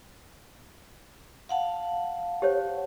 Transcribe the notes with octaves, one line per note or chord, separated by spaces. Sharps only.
F5 F#5 A5
G4 C5 C#5